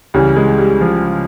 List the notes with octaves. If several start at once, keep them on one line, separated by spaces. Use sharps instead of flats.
C#2 C#3 E3 G3
G#3
G3
F3